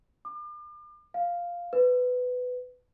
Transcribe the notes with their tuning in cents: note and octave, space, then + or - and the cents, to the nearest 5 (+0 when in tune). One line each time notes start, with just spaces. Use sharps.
D6 +40
F5 +0
B4 +15